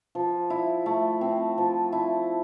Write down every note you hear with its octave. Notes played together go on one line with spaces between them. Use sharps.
F3
E4
A3
C4
F3
E4